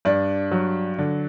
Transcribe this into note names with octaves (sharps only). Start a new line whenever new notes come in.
G2 D4
F#3
D3